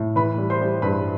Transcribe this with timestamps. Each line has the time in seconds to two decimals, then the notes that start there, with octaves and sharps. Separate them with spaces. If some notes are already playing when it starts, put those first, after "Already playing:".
Already playing: A2
0.16 E3 B4 B5
0.38 G3
0.50 C5 C6
0.61 G3
0.82 G2 B4 B5